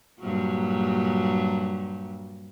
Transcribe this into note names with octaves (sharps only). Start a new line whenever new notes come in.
G2 A#2 F#3